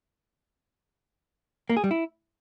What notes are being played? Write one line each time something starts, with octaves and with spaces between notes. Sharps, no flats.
A#3
G#4
G3
E4